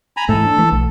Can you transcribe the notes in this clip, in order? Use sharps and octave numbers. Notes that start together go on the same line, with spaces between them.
G#5 A#5 B5
G#2 E3 A3 A4
D4
E3 A3
B1